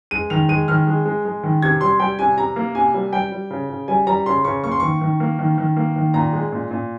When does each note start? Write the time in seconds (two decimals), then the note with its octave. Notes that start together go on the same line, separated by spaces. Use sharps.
0.11 G#3 D#7
0.30 D#3 F7
0.49 G#3 D#7
0.68 D#3 F6
0.87 G#3
1.05 G#3
1.25 G#3
1.43 D#3
1.62 C3 G#6
1.81 G3 C6
2.00 G3 G5
2.19 C3 G#5
2.37 C3 A#5
2.56 A#3
2.75 C3 G#5
2.94 G3
3.13 G3 G5
3.32 G3
3.50 C#3
3.70 C#3
3.88 G3 G#5
4.07 G3 A#5
4.26 C#3 C6
4.45 C#3 C#6
4.64 A#3 C#6
4.72 C6
4.80 D#3 C#6
5.01 D#3
5.20 A#3
5.39 D#3
5.58 D#3
5.76 A#3
5.96 D#3
6.14 A#2 A#5
6.33 G#3
6.52 A#2
6.71 A#2